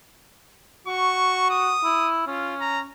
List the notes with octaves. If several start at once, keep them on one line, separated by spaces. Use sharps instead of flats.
F#4 C#6
D#6
E4
C#4 F4
A#5